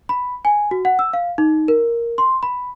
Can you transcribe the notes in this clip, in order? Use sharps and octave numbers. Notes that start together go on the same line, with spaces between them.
B5
G#5
F#4
F#5
E6
F5
D#4
A#4
C6
B5